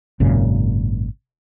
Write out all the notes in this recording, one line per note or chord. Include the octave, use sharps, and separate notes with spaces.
G#1 F#2 A#2 C#3